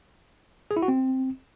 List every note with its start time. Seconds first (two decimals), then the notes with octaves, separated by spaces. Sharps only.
0.71 G#4
0.77 E4
0.82 F#4
0.88 C4